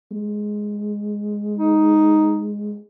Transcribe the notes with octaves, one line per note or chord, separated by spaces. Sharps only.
G#3
D#4